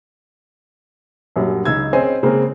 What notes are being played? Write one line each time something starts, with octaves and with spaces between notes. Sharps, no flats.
A#1 F#2 F#3 G3
C#2 D#4 E6 G#6
C4 C#4 G#4 C5 D#5 G#5
C#3 G#3 A#3 C4 G#4 A#4